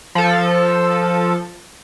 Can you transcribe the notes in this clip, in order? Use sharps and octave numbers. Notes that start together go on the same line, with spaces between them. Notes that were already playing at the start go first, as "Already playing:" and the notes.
F3 A4